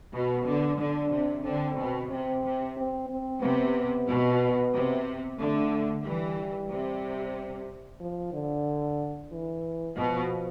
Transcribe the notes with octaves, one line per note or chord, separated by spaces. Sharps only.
B2 B3
D3
D3 D4
C3
D3 C4
B2
C3 C4
C3
C4
C4
C3 B3
B2
C3
D3 A3
E3 G3
C3
F3
D3
E3
B2 F3